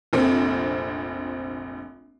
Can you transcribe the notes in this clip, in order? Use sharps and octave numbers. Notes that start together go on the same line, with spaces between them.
F1 A#1 C4